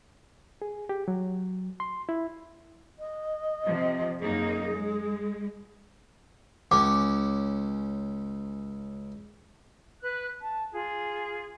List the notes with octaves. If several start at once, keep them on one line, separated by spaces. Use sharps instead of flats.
G#4
G4
F#3
C6
E4
D#5
C3 F3
F#2 A#3 D#4 G#4
G#3
C#2 C#4 D6
B4 F#6
A5
F4 G#4